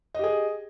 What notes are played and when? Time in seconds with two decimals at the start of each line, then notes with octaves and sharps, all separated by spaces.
0.15 D#5
0.19 G4
0.24 G#4